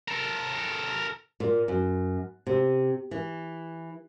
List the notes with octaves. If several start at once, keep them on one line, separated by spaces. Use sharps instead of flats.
A4 A#4
A#2
F#2
C3
E3